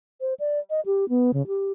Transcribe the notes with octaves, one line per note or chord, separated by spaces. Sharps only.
C5
D5
D#5
G4
B3
C#3
G4